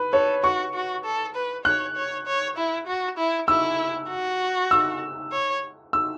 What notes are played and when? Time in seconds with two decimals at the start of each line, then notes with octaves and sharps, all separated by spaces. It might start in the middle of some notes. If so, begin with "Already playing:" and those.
Already playing: B4
0.13 A4 C#5
0.43 F#4 C#6
0.74 F#4
1.05 A4
1.35 B4
1.65 C#5 F#6
1.96 C#5
2.26 C#5
2.57 E4
2.87 F#4
3.18 E4
3.48 E4 E6
4.09 F#4
4.71 E6
5.32 C#5
5.93 E6